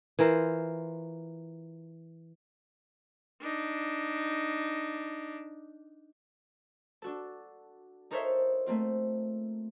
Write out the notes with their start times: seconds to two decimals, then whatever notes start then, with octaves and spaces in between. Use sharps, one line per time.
0.19 E3 F4 A#4 C5
3.41 D4 D#4
7.02 D4 F#4 A4
8.11 D#4 A4 A#4 C5 C#5 E5
8.66 A3 A#3 C4 F4